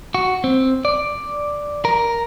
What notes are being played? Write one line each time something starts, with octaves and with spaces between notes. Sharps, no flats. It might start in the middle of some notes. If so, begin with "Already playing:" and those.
F#4
C4
D5
A#4